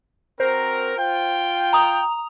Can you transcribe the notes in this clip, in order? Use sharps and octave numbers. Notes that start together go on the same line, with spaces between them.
C4 F#4 A#4 C5
F4 G5
A#5 D#6 F7